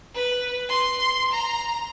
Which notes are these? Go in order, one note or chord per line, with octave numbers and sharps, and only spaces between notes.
B4
C6
A#5